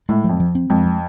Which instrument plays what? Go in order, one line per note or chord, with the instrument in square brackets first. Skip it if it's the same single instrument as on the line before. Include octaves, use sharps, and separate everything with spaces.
[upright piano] A2 [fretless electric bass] G#3
[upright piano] F2 [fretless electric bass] F3
[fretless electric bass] F3
C4
[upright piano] F2 [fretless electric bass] G#3
[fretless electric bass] F3